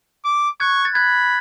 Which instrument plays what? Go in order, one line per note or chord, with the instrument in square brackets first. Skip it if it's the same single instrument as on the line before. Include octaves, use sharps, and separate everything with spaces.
[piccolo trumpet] D6
[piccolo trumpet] C#6 [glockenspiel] F#6 G#6
[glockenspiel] A6
[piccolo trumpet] B5 [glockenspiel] F#6 G#6